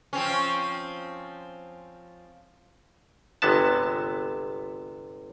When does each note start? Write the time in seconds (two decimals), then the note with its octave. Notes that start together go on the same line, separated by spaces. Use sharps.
0.13 F3 C4 C#4
3.42 G1 C3 G#3 B3 A5